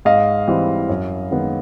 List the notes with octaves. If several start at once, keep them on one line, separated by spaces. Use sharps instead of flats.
G#2 D#5 F5
E3 G3 C4
F#2
D#3 G#3 B3